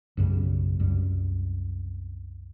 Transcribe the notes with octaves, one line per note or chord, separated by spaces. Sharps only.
B1 F#2 C#3 G3
C2 F#2 G3